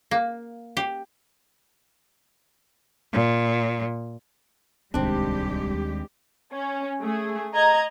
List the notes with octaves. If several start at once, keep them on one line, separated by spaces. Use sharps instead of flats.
A#3
G4
A#2
D1 C2 D#3 G3 G#3 C4 D4 G4
D#2
C#4
A3 G#4
D#5 A#5 G#6